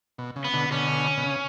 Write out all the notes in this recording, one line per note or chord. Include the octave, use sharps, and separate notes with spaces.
B2
C#3
B3
B2 D3
B2 D3 C#4
B2
C#3